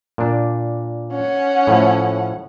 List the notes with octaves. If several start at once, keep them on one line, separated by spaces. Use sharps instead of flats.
A#2 D4
C#4 F#5
A2 F3 A3